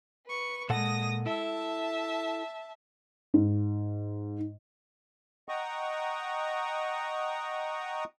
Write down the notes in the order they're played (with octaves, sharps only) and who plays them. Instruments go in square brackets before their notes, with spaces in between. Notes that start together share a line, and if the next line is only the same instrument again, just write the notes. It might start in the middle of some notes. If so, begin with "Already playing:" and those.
[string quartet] B4 C#6
[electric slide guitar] A#2 A4 F#5 [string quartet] G#3 D#6 A#6
[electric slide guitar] E4 A4 [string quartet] E5 A5
[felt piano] G#2
[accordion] D#5 F#5 G5 A#5 C#6 D#6